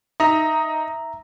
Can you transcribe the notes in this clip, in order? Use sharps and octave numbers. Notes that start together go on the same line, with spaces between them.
D#4 E5 A#5